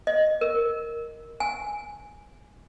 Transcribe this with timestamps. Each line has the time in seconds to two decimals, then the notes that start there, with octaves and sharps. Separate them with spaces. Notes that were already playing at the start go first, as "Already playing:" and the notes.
0.07 D#5
0.41 A#4
1.40 G#5